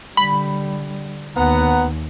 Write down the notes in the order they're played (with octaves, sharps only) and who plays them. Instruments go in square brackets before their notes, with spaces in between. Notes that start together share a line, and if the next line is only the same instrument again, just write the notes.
[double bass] D3 G3 [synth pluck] B5
[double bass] D#2 [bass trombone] B3 [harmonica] F#5 A#5